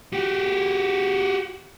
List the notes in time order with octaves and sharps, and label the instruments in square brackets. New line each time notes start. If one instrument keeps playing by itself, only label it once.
[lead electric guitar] F#4 G4